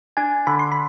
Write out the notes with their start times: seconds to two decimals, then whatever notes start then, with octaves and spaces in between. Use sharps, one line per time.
0.17 D4 G#5
0.47 D3 B5
0.59 C6
0.72 B5